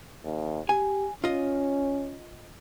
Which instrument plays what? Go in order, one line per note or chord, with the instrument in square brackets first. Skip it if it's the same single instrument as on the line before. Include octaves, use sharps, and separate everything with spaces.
[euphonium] D#2
[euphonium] G4 [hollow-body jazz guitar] G#5
[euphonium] C#4 [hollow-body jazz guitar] F4 D#5